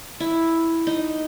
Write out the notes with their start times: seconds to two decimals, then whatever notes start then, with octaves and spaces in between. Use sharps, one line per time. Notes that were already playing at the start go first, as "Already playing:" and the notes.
0.20 E4
0.87 D#4